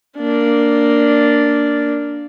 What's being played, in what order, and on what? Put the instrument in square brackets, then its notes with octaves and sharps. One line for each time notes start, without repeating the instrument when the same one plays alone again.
[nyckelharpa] A#3 D4